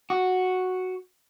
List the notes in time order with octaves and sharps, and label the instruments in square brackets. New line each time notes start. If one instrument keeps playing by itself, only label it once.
[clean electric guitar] F#4